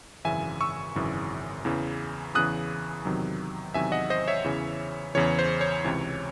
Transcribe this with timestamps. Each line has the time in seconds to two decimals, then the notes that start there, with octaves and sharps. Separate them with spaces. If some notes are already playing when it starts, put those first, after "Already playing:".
0.25 G#1 F#2 C#3 E3 E5 G#5
0.61 C#6 E6
0.95 G#1 F#2 C#3 E3
1.65 E2 C#3 E3
2.35 E2 C#3 E3 D#6 F#6
3.05 E2 C3 D#3 F#3
3.74 E2 C3 D#3 F#3 E5 G#5
3.92 D#5 F#5
4.10 C5 D#5
4.28 C#5 E5
4.44 E2 C#3 E3
5.15 E2 C#3 E3 C#5
5.39 C5
5.61 C#5
5.84 C#2 C3 E3